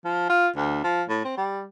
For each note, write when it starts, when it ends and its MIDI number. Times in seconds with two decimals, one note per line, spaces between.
0.05 0.27 53
0.29 0.48 65
0.56 0.83 38
0.83 1.03 53
1.09 1.20 45
1.24 1.35 60
1.37 1.65 55